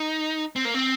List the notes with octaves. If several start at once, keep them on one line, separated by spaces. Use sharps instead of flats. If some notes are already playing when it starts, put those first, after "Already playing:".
Already playing: D#4
C4
A#3
C4